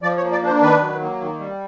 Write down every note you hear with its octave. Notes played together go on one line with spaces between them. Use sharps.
F3 D5
C#5
A#3
D5
D4 C5
D#3 B4
F#3
A#3
D#3
G3